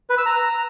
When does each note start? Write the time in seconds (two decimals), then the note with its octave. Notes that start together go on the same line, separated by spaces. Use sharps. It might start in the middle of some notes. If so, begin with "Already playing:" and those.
0.10 B4
0.18 E6
0.26 A#5